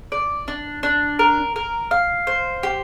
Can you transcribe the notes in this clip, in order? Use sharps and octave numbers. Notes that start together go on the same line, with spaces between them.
D5
D4
D4
A#4
A#4
F5
C5
G4